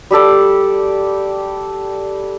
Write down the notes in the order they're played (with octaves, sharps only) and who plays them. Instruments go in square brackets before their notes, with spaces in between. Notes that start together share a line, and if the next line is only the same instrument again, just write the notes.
[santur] G3 G4 A4 D5